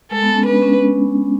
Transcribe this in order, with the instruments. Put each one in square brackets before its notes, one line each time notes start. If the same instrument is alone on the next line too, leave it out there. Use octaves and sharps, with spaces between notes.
[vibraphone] G#3 [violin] A4
[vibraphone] B3
C#4
[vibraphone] D4 [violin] B4
[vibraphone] C#4